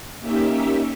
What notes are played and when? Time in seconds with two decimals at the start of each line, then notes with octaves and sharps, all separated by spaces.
0.20 A#3 C#4 D#4 G4 E5